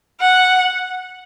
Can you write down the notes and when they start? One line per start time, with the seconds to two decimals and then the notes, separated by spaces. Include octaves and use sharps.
0.21 F#5